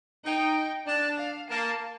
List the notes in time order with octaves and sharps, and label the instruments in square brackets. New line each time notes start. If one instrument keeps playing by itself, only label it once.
[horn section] D#4 [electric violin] G5
[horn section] D4 [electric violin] A5
[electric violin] F5
[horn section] A#3 [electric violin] A5